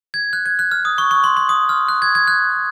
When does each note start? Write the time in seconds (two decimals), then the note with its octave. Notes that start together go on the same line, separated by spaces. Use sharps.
0.14 G#6
0.33 F#6
0.46 G#6
0.59 F#6
0.71 F6
0.85 D#6
0.98 C#6
1.11 C#6
1.24 C6
1.37 C6
1.49 D#6
1.69 F6
1.88 F#6
2.02 G#6
2.15 G#6
2.28 F#6